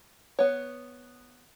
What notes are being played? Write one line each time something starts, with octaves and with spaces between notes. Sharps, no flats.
B3 C#5